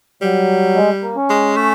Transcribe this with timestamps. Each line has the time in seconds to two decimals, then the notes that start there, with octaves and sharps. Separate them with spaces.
0.22 F#3 G3
0.76 G#3
1.02 A#3
1.16 C#4
1.30 G#3
1.57 A3